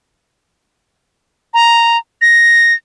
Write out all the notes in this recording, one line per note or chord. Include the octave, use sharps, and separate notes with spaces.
A#5
A#6